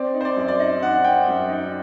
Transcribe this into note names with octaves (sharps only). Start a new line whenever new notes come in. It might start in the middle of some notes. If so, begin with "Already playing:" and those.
Already playing: C4 D5
D#4
C5
D5
F#2
D5
D#4 D#5
D#4 F#5
D#4 G5
F#2
D#4